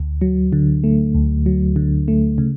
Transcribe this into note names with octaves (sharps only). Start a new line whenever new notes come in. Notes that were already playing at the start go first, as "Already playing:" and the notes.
Already playing: D2
F#3
D3
A3
D2
F#3
D3
A3
C#3